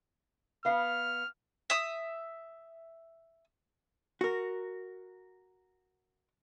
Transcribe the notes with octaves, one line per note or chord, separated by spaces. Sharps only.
B3 F5 F6
E5 D#6
F#4 A#4